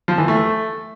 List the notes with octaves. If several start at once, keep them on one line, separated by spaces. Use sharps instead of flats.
F3
E3
A3